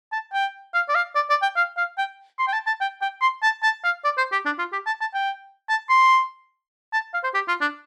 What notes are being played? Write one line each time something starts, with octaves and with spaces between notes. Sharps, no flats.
A5
G5
F5
D5
F5
D5
D5
G5
F5
F5
G5
C6
G5
A5
A5
G5
G5
C6
A5
A5
F5
D5
C5
G4
D4
F4
G4
A5
A5
G5
A5
C6
A5
F5
C5
G4
F4
D4